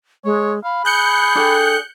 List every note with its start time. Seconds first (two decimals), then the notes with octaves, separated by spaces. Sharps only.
0.25 G#3 C#5
0.64 F5 B5
0.85 G#4 F#6 G6 C#7
1.35 D4 A4 G5